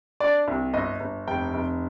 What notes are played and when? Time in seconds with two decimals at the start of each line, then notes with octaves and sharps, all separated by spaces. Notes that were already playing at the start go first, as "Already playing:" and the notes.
0.20 D4 D5
0.48 C2
0.74 G1 D#5
1.00 G1
1.27 F1 G5
1.54 F1